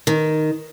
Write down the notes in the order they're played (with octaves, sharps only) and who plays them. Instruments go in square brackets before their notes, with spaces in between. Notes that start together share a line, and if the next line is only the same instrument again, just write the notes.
[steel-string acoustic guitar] D#3